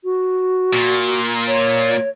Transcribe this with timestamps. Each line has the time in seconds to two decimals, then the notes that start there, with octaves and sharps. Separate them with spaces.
0.04 F#4
0.73 A#2
1.48 C#5